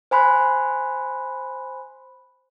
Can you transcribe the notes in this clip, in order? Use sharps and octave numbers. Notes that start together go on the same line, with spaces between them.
C5 G#5 B5 C6 F#6